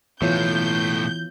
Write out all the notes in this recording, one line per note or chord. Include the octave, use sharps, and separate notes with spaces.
B1 A2 E3 B3 F4 C#5 G6